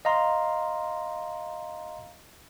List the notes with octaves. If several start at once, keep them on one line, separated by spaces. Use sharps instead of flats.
D#5 F5 A#5 C6